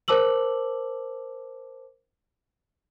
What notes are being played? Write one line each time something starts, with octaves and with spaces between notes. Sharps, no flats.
A#4 C5 A5 D6 E6 F#7